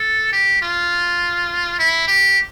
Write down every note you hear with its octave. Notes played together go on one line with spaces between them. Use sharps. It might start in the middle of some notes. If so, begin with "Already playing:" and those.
Already playing: A4
G4
F4
E4
G4